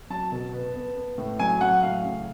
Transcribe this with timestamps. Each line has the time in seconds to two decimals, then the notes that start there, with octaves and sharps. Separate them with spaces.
0.10 F#3 A5
0.32 B2
0.53 B3
0.75 B3
0.96 B3
1.18 A2
1.39 F#3 G#5
1.61 F#3 F#5
1.83 A2 F5
2.04 C#3